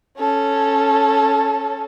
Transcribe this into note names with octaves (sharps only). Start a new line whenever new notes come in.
C#4 A4